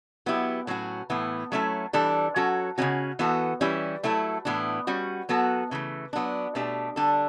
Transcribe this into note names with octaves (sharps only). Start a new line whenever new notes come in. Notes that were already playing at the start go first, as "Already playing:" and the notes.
F#3 B3 E4 G4
A2 F#3 C#4 F#4
A2 E3 B3
F#3 A3 C#4 E4 A4
E3 G3 D4 A4
F#3 C#4 F#4 A4
C#3 G3 C#4 F#4
E3 B3 F#4 A4
E3 G3 C#4 E4
F#3 A3 E4 A4
A2 E3 B3 D4
G3 C#4 F#4
F#3 B3 F#4 A4
C#3 E3 A3
F#3 B3 D4
B2 A3 D4 G4
D3 G3 D4 A4